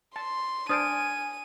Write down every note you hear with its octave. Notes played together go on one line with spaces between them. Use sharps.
A5 C6
D4 C5 G#5 A5 D#6 F6 D7 D#7